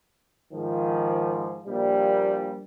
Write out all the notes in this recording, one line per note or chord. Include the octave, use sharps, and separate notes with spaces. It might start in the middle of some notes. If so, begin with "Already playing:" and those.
G#2 D#3 F3
A#1 A#2 G3